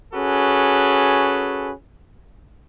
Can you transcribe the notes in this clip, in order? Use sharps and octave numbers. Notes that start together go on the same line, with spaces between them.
C#4 F#4 G#4 A4 B4